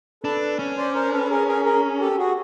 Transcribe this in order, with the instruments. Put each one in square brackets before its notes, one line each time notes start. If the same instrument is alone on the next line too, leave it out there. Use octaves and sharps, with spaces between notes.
[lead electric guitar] D4 [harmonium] A4 B4
[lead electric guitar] C#4
[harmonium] C5 D5
A#4 C5
A4 B4
G#4 A#4
G#4 A#4
G#4 A#4
G4 A4
F#4 G#4